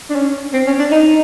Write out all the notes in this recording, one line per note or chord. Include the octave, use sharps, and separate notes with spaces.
D4
C#4
C4
C#4
D4
D#4